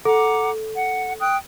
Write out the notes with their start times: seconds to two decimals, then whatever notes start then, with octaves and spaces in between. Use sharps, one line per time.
0.05 A4 F#5 A#5 D6
0.75 F#5
1.21 G5 D#6 F#6